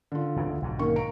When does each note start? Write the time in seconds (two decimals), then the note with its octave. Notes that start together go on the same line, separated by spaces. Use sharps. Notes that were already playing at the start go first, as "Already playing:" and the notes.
0.12 D3 F4
0.36 E2 G2 C#3
0.48 D2
0.62 B1 G#2 D3
0.79 D#3 A#3 C#6
0.96 A#3 A#5 D7